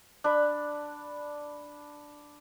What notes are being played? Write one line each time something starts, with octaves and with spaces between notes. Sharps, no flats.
D4 B5